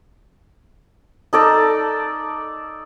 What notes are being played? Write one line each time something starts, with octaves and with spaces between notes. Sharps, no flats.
D#4 A4 D5